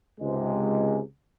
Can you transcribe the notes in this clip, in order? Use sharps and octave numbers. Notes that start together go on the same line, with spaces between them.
C#2 G#2 C3 G#3